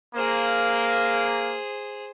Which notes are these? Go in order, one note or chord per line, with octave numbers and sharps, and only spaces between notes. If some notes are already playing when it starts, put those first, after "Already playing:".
A#3 G#4 C5